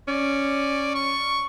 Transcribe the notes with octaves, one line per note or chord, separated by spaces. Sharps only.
C#4 D5
C#6